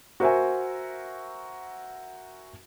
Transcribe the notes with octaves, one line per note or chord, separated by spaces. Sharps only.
F#4 A#4 C5 E5 F#5 G#5